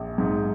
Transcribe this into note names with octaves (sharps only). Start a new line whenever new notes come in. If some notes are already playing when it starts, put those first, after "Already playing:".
Already playing: A#1
G#2